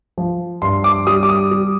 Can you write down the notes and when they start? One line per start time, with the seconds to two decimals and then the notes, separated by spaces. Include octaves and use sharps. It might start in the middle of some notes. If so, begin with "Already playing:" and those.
0.18 F3
0.62 G2 C6
0.84 D6
1.07 G3 D#6
1.23 D6
1.29 D#6
1.51 G3